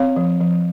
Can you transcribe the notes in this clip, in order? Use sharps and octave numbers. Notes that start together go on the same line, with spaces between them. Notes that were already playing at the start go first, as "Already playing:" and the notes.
Already playing: C4 C#5 F5
F3
F3